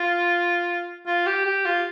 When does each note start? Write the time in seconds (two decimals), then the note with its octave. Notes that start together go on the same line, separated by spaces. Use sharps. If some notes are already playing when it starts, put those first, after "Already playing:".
Already playing: F4
1.07 F4
1.27 G4
1.45 G4
1.65 F4